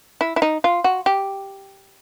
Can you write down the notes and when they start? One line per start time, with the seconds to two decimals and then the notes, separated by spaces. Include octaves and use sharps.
0.21 E4
0.36 E4
0.42 D#4
0.64 F4
0.84 F#4
1.06 G4